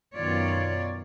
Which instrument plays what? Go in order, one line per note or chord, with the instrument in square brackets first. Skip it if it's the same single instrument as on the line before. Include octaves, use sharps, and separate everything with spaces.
[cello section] F#2 B2 D#3 F4 C#5 D5